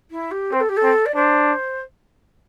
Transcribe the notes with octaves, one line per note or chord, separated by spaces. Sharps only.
E4
G4
C4 C5
A4
G4
A4
C4
D5
D4 C5